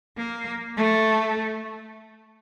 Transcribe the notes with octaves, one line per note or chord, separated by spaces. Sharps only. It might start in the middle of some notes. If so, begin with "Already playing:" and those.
A#3
A3